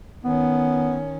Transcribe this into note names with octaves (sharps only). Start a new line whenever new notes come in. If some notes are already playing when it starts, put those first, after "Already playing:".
D#3 B3 C#4